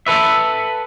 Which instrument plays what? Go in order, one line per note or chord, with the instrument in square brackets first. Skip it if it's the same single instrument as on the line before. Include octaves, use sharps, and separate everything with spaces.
[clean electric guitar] A4 B4 E5